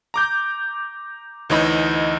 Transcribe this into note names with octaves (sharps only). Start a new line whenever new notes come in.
A#5 D6 G6
D2 E3 D#4 C#5 D#5 B5